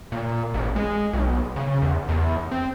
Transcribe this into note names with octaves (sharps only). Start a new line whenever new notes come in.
A#2
A1
G#3
B1
C#3
E2
E2
C4